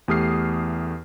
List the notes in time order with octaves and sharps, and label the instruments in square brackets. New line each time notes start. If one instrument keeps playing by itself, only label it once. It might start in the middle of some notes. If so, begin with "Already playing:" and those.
[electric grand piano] E2 A3 G4 D#6 F6 C7